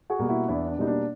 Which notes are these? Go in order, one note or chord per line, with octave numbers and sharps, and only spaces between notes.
F#4 G#4
B2 G3 A#3
E4 F#4
E2 D4 E4
D4
B2 G3 A#3 D#4
D4